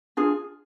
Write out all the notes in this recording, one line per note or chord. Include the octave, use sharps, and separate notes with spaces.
D4 F4 G#4